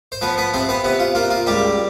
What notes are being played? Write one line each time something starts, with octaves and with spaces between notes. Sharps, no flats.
C5
F3 B3 B4
B3 B4
C3 C4 C5
B3 B4
C3 B3 B4
F4
A#3 F4
F4
C#2 G3 G4